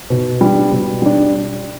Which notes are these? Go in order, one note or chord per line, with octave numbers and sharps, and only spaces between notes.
B2
G3 D4
B2
G3 D4